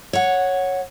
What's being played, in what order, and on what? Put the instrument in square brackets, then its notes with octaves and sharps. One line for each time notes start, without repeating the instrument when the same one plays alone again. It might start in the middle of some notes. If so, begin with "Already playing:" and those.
[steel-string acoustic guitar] C#5 F#5